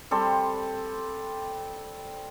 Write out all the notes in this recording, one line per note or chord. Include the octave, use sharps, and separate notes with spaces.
G3 C4 A4 C6